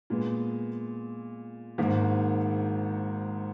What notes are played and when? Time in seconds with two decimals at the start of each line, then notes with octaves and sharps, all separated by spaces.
0.10 A#2 G#3 B3
1.78 G#1 G#2 D#3 A#3